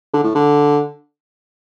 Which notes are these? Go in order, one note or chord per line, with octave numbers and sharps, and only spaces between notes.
D3
A2
D3